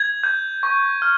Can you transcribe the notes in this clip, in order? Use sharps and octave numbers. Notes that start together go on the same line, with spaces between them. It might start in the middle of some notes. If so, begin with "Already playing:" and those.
Already playing: G#6
G6
C#6
F6